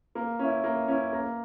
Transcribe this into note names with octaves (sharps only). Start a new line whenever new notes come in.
A#3
C#4 E4
A#3
C#4 E4
A#3